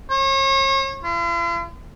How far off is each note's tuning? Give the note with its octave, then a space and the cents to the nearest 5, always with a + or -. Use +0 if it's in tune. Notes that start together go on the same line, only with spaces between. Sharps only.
C#5 -40
F4 -45